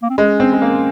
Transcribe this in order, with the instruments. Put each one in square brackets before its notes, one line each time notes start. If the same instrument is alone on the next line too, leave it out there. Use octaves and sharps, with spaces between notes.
[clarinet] A#3
C4
[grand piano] G#3 [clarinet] C#4
[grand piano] C4
G#3
A#3